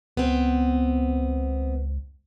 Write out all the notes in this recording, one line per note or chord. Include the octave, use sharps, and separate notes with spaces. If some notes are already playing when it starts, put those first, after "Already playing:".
C#2 B3 C4